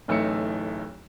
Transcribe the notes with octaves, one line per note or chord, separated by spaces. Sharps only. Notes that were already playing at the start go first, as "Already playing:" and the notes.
D1 A1 A3 D#4 E6 C#7